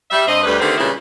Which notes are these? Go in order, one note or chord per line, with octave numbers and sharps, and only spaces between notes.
G3 E5
G2 C4 D#5
D2 G3 B4
D3 D#3 A3 C4 G4
A#2 C#3 G3 G#3 E4 B4